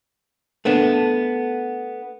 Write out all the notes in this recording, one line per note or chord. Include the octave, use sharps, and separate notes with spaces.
A3 B3 D4